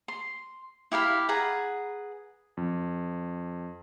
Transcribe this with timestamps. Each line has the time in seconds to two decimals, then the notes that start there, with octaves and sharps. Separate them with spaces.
0.08 C6
0.92 E4 G4 F5 B5
1.29 G#4 B4 F#5 A#5
2.57 F2